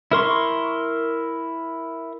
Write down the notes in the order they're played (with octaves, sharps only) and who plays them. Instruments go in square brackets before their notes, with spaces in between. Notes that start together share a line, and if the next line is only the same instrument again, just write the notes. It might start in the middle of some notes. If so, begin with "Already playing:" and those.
[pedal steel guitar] E4 A#4 C6 C#6